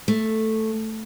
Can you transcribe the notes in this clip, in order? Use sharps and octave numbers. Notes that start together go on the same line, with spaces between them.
A3